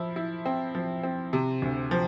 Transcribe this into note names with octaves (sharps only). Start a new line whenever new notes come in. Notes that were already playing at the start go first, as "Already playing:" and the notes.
Already playing: F3 E4
E4
C4
F3
C4
C3
D2
F3